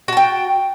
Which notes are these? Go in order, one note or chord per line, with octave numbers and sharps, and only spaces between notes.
F#4 G5 A5